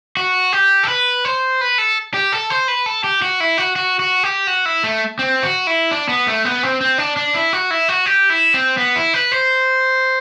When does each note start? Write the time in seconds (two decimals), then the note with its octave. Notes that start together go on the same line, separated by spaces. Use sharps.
0.17 F#4
0.53 G4
0.83 A4
0.88 B4
1.25 C5
1.61 B4
1.78 A4
2.14 G4
2.32 A4
2.50 C5
2.68 B4
2.86 A4
3.04 G4
3.22 F#4
3.40 E4
3.58 F#4
3.76 F#4
4.00 F#4
4.23 G4
4.47 F#4
4.66 E4
4.84 A3
5.19 C4
5.43 F#4
5.67 E4
5.91 D4
6.09 B3
6.27 A3
6.45 B3
6.63 C4
6.81 C4
6.98 D4
7.17 D4
7.35 E4
7.53 F#4
7.71 E4
7.88 F#4
8.06 G4
8.30 E4
8.54 C4
8.78 B3
8.96 E4
9.14 B4
9.32 C5